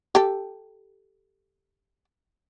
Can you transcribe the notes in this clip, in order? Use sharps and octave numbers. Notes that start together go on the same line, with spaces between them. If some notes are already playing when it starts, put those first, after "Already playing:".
G4 A4